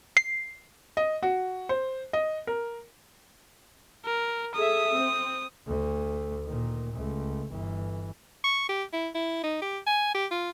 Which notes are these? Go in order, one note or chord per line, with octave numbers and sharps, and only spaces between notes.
C7
D#5
F#4
C5
D#5
A#4
A#4
G#4 A4 E5 D#6
C4
D2 A3
A#2 D#3
C#2 A3
G1 E3
C#6
G4
E4
E4
D#4
G4
G#5
G4
F4